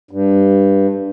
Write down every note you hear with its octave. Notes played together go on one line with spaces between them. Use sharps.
G2